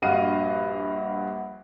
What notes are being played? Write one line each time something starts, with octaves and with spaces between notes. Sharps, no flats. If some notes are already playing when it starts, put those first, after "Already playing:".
A#1 G2 F#4 D#5 F5 D#7